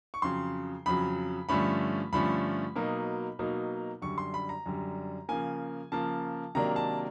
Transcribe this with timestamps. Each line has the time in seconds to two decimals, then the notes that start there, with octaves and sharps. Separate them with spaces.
0.14 C#6
0.22 F2 C#3 F#3 C6
0.86 F2 C#3 F#3 B5
1.49 G2 D3 F3 A3 C#4 B5
2.13 G2 D3 F3 A3 C#4 B5
2.76 B2 F#3 A#3 D#4
3.39 B2 F#3 A#3 D#4
4.02 F#2 D3 G3 C#6
4.18 C6
4.34 B5
4.49 A#5
4.66 F#2 D3 G3
5.29 C#3 F3 A#3 G#5
5.92 C#3 F3 A#3 A5
6.55 C3 D#3 F#3 A#3 D4 A#5
6.76 A5